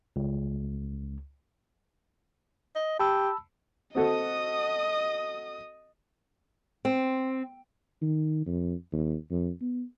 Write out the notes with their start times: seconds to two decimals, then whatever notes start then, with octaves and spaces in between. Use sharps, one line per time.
0.16 C#2
2.75 D#5
3.00 G4 A5 B5 E6
3.95 C4 F#4 A4 D#5 D#6
6.85 C4
8.02 D#3
8.46 F2
8.92 D#2
9.31 F2
9.61 B3